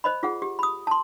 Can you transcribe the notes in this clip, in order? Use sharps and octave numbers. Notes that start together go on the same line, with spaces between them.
C5 D#5 B5
F4 G#4 F#5
G4
B5 D#6
A5 C6